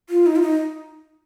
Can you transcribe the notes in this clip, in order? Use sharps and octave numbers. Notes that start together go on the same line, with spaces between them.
F4
D#4
F4
D#4